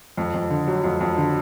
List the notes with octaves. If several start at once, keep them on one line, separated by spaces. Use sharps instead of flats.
F2
F2
D3
F#3
F2
F2
D3